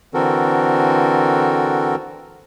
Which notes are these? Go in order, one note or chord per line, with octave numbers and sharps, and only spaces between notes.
D3 E3 C4 F#4 A4 A#4